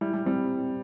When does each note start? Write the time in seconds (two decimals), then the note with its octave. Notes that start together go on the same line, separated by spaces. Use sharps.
0.01 G3 E4
0.13 G3
0.26 G3 C4